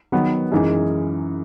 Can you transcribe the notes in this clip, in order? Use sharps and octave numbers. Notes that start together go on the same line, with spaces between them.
D#3 F#3 B3
F#2 E3 G#3 D#4 G#4